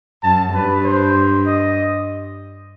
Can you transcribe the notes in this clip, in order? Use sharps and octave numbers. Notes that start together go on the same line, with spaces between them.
F#2 A5
G2 B4
C5
D#5